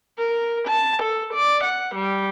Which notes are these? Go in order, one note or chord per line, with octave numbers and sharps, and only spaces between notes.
A#4
A5
A4
D5
F#5
G3